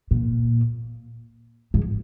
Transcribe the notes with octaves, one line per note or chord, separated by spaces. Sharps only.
A#2
G#2